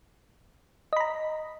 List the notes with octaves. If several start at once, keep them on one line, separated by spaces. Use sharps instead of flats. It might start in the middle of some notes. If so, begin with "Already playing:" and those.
D#5 A#5 B5